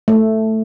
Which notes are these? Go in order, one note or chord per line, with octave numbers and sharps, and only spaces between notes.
A3